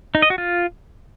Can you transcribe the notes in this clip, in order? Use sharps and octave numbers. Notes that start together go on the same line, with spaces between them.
D#4
D#5
F#4
F4